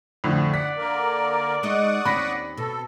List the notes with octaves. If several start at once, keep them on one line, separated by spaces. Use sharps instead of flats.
F2 A2 D3
D5 F#5 B6
D3 A#3 A#4
G#3 D#4 D#5 F#5 C#6 D#6
D#2 C4 C#4 B5 A#6 B6
B2 A4